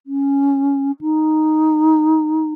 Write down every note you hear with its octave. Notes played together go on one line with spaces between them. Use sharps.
C#4
D#4